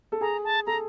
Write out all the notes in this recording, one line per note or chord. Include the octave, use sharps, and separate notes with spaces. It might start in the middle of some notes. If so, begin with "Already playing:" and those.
A4
G#4 A#5
A5
A4 A#5